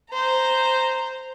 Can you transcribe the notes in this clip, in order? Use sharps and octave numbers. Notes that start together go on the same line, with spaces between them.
C5 A#5